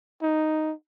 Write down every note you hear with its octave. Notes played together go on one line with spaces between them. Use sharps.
D#4